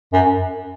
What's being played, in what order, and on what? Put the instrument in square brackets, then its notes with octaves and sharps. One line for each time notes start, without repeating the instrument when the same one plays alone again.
[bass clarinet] F#2